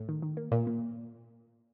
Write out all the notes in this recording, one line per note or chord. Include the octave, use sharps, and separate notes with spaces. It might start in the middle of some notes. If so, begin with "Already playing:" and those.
Already playing: A2
D#3
D#3
A#3
A#2 A#3
A#3